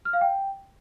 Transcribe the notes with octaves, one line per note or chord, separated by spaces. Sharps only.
F6
F5
G5